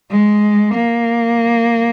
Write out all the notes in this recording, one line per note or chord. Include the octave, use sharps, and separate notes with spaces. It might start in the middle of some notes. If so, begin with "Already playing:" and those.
G#3
A#3